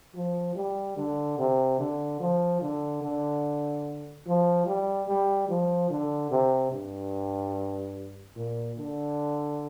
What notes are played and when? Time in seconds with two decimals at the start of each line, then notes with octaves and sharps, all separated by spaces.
0.14 F3
0.55 G3
0.96 D3
1.38 C3
1.79 D3
2.20 F3
2.61 D3
3.02 D3
4.26 F3
4.66 G3
5.08 G3
5.49 F3
5.90 D3
6.30 C3
6.72 G2
8.36 A#2
8.78 D3